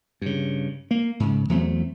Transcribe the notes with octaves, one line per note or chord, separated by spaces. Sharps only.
G2 C#3
A#3
G#2 C#3
E2 F#3 A3 C4